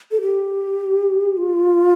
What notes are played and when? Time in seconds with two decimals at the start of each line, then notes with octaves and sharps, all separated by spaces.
0.11 A4
0.22 G4
1.37 F4